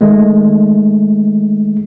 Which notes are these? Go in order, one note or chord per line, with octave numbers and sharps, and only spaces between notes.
D#3 G#3 A3